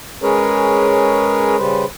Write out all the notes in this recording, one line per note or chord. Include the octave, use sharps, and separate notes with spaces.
G#3 C#4 G#4 A#4 B4 C#5
C#3 G3 B4 C5